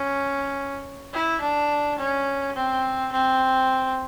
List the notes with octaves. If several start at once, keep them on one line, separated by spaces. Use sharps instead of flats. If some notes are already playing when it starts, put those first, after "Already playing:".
Already playing: C#4
E4
D4
C#4
C4
C4